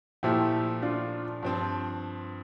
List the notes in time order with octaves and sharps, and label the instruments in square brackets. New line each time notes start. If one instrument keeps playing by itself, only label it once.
[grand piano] A#2 F3 A3 [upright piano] E4 G4
[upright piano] D4 F4
[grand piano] G2 F3 C4